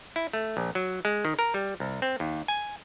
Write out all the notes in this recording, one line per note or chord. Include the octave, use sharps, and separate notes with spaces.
E4
A3
A#1
F#3
G#3
D#3
A#4
G3
C2
C4
D#2
G#5